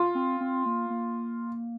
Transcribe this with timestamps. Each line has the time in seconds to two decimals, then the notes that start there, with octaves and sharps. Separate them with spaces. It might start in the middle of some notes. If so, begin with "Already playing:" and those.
Already playing: F4
0.15 C4
0.41 C4
0.66 A#3
0.90 A#3